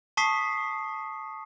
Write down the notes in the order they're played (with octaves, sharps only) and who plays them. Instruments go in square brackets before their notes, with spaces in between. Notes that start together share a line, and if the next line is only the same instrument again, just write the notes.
[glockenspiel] A5 C#6 D#6 B6 C7